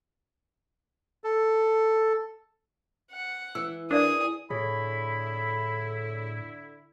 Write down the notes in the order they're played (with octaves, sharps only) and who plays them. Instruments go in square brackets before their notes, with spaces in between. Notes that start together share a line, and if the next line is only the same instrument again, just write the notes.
[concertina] A4
[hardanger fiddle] F#5
[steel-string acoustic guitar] E3 [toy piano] E6
[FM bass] D4 [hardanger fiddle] G#4 D#6 [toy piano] A#4 D5 E5
[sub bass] A2 [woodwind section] D3 E4 [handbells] G#4 C#5 [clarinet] B5